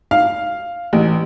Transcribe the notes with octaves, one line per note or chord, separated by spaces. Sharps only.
F5
A1